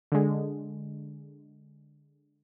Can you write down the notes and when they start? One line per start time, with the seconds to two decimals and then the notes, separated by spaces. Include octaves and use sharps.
0.12 D3 G#3